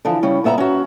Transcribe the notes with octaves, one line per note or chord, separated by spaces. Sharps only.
D3 E3 F3
C#3 G3 C#4
A#2 B3 E5 G#5 A#5
C#4 F#4